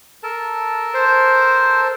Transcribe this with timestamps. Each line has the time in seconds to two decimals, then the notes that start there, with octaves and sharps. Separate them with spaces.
0.23 A4 A#4 A5
0.94 C5